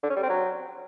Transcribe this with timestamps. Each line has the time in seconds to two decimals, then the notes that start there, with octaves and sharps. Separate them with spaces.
0.03 D3
0.10 C#4
0.16 G3
0.23 C4
0.30 F#3